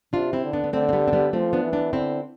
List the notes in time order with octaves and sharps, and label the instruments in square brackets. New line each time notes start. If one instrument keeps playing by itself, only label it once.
[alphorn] C3 [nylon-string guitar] D4 F4
[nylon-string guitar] C4 E4
[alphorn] D3
[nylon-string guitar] B3 D4
B3
[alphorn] D3 [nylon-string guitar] A3 C4
[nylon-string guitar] C4
G3 B3
C4
G3 B3
[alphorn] F3 [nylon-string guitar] A3 C4
[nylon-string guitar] B3 D4
[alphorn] E3
[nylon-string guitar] B3 D4
[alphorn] D3 [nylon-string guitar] C4 E4